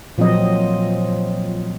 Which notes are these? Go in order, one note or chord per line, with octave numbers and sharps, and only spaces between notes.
A#2 F3 F#3 C4 D#5